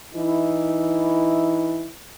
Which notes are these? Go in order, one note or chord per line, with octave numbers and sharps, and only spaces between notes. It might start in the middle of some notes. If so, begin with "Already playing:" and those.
E3 D#4 E4